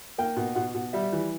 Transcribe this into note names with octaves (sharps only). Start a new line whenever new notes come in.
A#3 G5
B2
B2 F#5
B2
G3 E5
E3